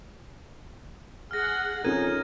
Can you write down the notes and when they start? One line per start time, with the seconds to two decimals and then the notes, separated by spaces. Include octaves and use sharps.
1.31 G#4 F#5 F6 A#6
1.85 F2 C#4 D#4 G#4 A#4 G#6 D#7